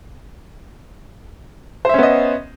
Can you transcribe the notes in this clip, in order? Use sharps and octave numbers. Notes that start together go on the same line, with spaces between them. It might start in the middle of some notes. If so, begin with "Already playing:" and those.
B3 C#4 C5 D#5 E5